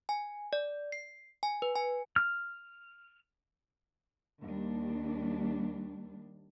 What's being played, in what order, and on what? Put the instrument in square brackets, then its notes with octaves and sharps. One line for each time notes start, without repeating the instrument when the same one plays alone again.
[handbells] G#5
D5
C7
G#5
B4
G#5
[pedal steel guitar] F6
[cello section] D#2 G3 D4